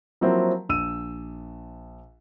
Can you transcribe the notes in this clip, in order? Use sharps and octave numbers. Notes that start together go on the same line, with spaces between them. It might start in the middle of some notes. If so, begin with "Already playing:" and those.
F3 F#3 A#3 C4 E4 F#4
A#1 E6 D#7